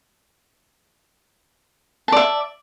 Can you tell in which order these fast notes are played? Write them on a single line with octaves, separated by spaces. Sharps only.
A5 D5 E5